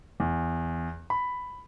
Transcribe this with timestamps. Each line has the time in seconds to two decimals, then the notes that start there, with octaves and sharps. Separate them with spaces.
0.20 E2
1.10 B5